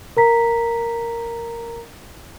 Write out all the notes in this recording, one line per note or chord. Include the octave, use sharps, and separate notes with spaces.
A#4 A#5 B6